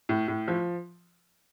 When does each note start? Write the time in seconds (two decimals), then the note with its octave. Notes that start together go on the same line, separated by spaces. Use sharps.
0.09 A2
0.28 A2
0.48 F3